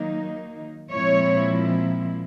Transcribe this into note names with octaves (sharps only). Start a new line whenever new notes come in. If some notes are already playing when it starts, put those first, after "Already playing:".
Already playing: D#3 F#3 A#3 D#4
A#2 F3 G#3 C4 E4 C#5